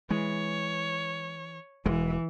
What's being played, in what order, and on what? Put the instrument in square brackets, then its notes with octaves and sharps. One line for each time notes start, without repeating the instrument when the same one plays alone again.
[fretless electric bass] E3 [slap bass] G#3 [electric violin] C#5
[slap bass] E1 G#3 [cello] E3